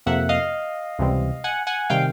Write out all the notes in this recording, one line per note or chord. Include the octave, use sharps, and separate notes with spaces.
F2 C3 F3 A#3 E5 F#5
D#5 F5
C#2 C3 E3 G3 C4
F#5 G#5
F#5 G#5
C3 D#3 G3 F5 G5